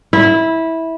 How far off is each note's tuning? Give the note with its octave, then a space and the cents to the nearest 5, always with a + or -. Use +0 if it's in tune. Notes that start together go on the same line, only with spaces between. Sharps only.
E4 -15